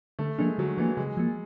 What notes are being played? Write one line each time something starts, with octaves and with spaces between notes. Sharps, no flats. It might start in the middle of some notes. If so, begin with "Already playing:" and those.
D3 A3
F3 G#3 A#3 D4
D3 F#3
E3 F3 A#3 D4
C#3 G#3
F3 A#3